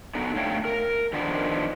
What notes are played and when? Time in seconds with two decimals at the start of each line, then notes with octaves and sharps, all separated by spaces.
0.15 D3 B3 D#4
0.36 A3 D4 C#5 F5 G5
0.65 A#4
1.13 D#3 F3 B3 D4